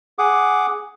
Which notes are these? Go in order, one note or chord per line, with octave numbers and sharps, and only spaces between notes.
G#4 F#5 D6 D#6